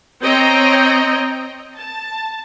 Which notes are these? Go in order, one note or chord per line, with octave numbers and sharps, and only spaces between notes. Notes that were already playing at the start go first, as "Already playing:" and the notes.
C4 C#5 D#5 G5 A#5
A5